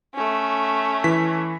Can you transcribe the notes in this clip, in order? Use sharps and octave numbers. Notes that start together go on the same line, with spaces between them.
A3 C#4
E3 B6